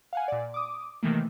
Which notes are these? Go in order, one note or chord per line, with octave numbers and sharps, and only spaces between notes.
F5 F#5 G#5
A#2 D5
D6 D#6
C3 D#3 E3 A3 A#3